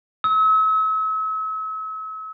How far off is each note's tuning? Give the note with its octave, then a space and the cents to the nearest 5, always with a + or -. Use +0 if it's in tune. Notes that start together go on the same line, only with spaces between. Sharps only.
E6 -40